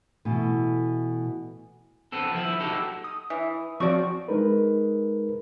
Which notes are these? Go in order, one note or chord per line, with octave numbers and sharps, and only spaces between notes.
B2 E3 A3
B3 C4 A4
F3 E4
D#4 F#4 G4 A4
D#6
E3
F3 C4 F#4 D5 C#6
G#3 D#4 A#4 B4